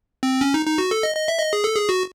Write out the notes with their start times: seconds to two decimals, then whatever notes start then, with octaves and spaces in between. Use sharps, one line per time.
0.23 C4
0.41 C#4
0.54 D#4
0.66 D#4
0.78 F#4
0.91 A4
1.03 D#5
1.16 D#5
1.28 E5
1.40 D#5
1.53 G#4
1.64 A4
1.76 G#4
1.89 F#4